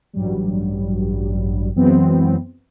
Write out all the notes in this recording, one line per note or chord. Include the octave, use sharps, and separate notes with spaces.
A1 G2 F#3 G3
F#2 E3 F#3 G#3 B3 C4